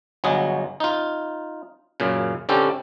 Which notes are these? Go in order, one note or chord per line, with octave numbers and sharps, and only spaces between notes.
G1 F#3 G#4 D#5
D#4 F4
F#2 A#2 C#3
D3 G3 C4 C#4 G4 A4